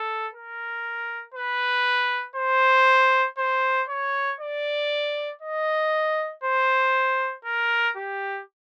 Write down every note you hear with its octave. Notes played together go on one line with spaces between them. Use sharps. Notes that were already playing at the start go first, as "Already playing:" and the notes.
Already playing: A4
A#4
B4
C5
C5
C#5
D5
D#5
C5
A#4
G4